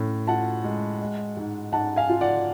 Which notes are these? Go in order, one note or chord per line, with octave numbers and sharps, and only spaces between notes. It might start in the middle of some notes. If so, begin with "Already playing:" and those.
Already playing: A2 C#4
F4 F#5 A5
G#3
G#3
G#2
G#2 F#5 A5
F5 G#5
F4
D5 F#5